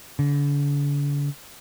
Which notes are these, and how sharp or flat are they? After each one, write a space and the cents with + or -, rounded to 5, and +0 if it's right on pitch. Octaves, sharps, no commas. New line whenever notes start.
D3 -40